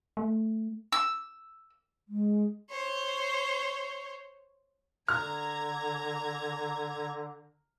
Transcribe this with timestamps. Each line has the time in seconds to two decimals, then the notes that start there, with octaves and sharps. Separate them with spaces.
0.17 A3
0.92 E6
2.08 G#3
2.71 C5 C#5
5.08 D3 A#5 F6 G#6